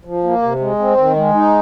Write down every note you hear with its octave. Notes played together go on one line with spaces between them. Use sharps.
F3
A#3
C3
G#3
C4
D#3
G#3
D#4